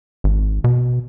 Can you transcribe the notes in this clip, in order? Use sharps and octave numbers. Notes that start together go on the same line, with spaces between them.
G#1
B2